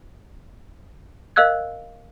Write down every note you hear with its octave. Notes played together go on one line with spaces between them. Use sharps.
A#4 D#5 F5 E6 F#6 G#6